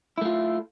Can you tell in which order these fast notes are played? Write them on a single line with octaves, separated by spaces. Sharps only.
E4 A3 F4